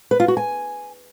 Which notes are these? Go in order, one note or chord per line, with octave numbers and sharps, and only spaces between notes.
B4
F4
F#4
G#5